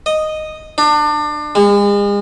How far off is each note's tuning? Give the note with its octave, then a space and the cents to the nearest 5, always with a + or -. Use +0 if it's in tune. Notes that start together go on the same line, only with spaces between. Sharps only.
D#5 -5
D4 +30
G#3 -40